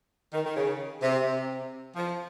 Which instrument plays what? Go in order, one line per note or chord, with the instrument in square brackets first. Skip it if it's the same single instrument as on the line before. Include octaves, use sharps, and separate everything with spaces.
[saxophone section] D#3
D#3
C#3
C3
C3
F3